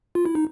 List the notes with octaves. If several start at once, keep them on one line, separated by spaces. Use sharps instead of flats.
F4
E4
D#4